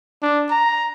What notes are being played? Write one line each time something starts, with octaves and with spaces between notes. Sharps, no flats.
D4
A#5